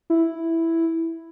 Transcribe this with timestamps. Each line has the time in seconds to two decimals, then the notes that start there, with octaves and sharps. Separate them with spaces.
0.10 E4